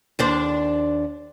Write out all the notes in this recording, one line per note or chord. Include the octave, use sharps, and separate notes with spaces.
D#2 D4 C5